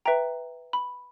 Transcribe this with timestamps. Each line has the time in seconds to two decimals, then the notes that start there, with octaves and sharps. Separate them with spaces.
0.05 B4 E5 G5 A#5
0.73 B5